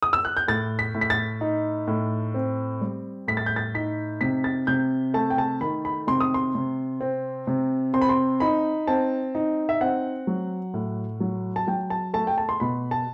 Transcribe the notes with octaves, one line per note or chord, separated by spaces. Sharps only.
D#6
E6
F#6
G6
A2 A6
B6
A2
B6
A6
D#4
A2
C4
G3
A2 B6
A6
G6
A6
D#4 B6
C3 B6
A6
C3 G6
A3 A5
G5
A5
D#3 B5
B5
C3 C6
D#6
C6
C3
C4
C3
C4 C6
B5
C6
D#4 B5
C4 A5
D#4
E5
C4 F#5
F#3
A2
F#3
A5
F#3 G5
A5
A3 A5
G5
A5
C6
B2 B5
A5